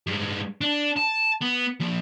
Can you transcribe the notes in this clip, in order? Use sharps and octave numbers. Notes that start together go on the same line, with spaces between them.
G2 G#3
D4
A5
B3
F3 A#3